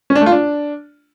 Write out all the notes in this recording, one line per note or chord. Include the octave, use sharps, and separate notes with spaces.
C#4
D4
A3
F4
D4